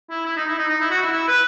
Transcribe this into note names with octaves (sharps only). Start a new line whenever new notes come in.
E4
E4
D#4
E4
D#4
D#4
E4
F#4
E4
E4
B4